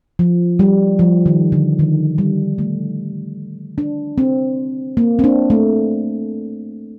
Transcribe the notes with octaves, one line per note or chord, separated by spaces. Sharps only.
F3
G3
F3
D#3
D3
D#3
G3
A3
D4
C4
A#3
C4
D4
A3